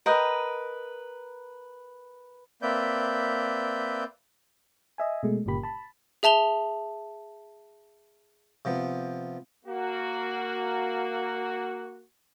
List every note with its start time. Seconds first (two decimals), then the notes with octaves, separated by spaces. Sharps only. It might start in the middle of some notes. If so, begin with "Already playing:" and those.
0.06 A#4 B4 D#5 G5
2.62 A#3 C4 B4 D5 E5 G6
4.98 D#5 E5 G#5
5.23 B2 G#3 A3
5.46 G1 A#2 C#3 A#3 G4 B5
5.63 A5 B5
6.23 G#4 E5 A5 F7 G7
8.65 C3 F3 B3
9.66 A#3 F#4